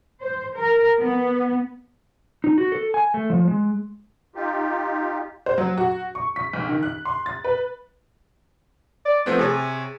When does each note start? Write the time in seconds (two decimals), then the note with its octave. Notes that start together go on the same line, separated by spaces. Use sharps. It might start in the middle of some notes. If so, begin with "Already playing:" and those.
0.21 C5
0.55 A#4
0.99 B3
2.44 D#4
2.58 F#4
2.72 A4
2.94 G#5
3.14 A3
3.30 F3
3.48 G#3
4.35 D#4 F4 G4
5.46 C5
5.58 F#3
5.77 F#4
6.15 C#6
6.36 B6
6.53 B1
6.69 D#3
6.83 F#6
7.05 C6
7.26 A6
7.45 B4
9.05 D5
9.26 F3 A3 B3 C4
9.39 C3 G#4 C#5 A6